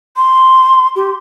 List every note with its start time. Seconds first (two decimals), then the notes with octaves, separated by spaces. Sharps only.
0.17 C6
0.96 G4